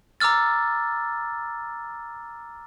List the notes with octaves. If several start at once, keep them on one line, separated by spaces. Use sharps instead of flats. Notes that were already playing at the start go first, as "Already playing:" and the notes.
A#5 D6 E6 F6 A6